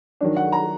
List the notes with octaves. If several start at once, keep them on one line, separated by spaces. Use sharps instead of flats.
D#3 F#3 D4
F#5
A#5